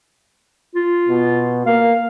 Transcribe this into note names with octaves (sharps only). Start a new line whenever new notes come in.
F4
B2
A#3 F5